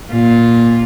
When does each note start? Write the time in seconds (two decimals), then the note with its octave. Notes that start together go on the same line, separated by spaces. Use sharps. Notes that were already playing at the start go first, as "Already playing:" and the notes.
0.11 A#2 F4